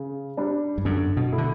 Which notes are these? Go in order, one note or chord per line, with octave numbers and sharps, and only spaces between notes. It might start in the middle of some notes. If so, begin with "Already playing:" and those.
Already playing: C#3
G3 D4
G2
F#2 D3
B2
A3 E4
D3